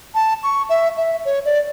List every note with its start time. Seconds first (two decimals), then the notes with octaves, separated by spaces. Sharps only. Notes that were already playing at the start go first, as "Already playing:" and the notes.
0.15 A5
0.43 C#6
0.69 E5
0.97 E5
1.25 C#5
1.45 D5